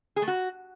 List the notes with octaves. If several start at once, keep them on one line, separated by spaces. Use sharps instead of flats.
G#4
A3
F#4